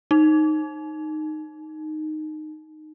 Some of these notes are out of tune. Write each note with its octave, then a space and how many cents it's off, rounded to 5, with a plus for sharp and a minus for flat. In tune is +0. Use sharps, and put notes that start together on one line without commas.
D#4 -10